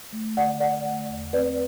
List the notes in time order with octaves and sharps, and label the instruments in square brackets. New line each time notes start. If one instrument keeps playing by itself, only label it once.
[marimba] A3
D3 D5 F#5
D3 D5 F#5
A3
E2
C4 B4 D5